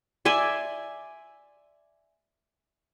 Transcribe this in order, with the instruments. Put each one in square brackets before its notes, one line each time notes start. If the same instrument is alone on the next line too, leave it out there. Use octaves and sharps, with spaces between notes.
[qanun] D5 E5 G#5 C6